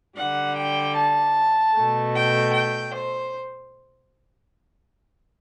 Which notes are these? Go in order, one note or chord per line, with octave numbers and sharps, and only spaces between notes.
D3 G3 F#5
G5
A5
B2 A3
G5
G5
C5